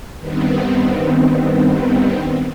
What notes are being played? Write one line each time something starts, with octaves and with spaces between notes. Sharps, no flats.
G2 D#3 B3 C4